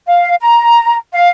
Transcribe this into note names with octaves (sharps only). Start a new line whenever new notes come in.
F5
A#5
F5